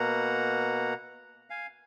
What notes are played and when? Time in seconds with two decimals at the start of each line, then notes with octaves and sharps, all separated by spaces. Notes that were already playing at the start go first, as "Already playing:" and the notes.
Already playing: B2 A#3 F#5 A#5
1.50 F5 G#5